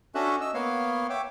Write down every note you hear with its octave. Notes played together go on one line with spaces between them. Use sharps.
C#4 D4 F#4 A4 E5 F#6
D#5 E6
A#3 B3 C#5 F5
C#5 E5 G5 D6